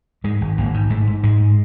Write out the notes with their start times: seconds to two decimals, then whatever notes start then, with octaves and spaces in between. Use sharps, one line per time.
0.24 G#2 G#3
0.41 G#1
0.58 G#1 A#3
0.74 G#2
0.90 G#2 A3
1.07 G#2
1.23 G#2 G#3